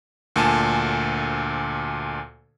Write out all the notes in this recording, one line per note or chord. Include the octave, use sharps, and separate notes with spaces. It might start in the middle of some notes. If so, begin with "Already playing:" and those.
D2 A#2 G#5 A5